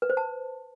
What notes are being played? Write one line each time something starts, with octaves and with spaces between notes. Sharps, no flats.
B4
C5
A5